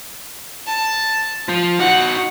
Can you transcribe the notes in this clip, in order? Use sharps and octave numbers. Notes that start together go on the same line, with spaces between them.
A5
F3
D#4 F#4 F#5